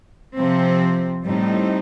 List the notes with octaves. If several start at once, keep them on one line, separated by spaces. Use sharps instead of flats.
C3 F3 C4
A2 G3 C4 D#4